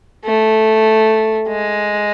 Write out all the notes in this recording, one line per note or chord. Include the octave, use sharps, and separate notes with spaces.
A3
G#3